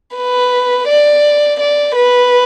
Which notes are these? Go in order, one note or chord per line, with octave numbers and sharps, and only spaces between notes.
B4
D5
D5
B4